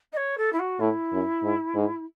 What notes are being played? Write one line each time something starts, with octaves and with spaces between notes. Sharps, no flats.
D#5
C#5
A4
E4
F#4
A2 E4
F#2
G#2
G#2